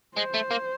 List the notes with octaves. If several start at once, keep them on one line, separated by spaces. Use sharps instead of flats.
G#3 C5
A3
A#3